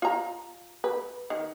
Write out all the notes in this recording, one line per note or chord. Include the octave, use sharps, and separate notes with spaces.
F4 A#5
B4
D#3